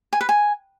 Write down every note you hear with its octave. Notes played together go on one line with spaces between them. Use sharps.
G#5
B4
G#5